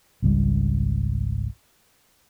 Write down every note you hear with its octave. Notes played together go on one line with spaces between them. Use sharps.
G#1 C#2 G3